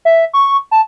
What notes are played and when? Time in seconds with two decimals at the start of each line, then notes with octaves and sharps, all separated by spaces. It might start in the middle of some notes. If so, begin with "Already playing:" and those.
0.05 E5
0.33 C#6
0.71 A5